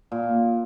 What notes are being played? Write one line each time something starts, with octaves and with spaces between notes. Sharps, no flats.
A#2